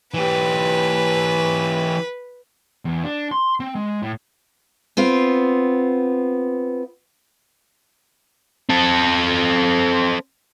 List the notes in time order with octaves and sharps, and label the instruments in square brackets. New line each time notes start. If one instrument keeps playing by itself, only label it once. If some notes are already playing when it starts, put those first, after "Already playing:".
[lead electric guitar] E3 G4 [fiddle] B4
[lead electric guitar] E2
D4
C6
C4
G#3
A2
[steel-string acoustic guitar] B3 C4 F4
[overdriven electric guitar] C4 A4